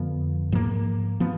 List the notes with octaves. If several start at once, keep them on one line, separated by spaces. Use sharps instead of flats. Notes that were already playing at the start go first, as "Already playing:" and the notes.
Already playing: F2 D3 F3 B3
G#2 F3 A#3
F3 B3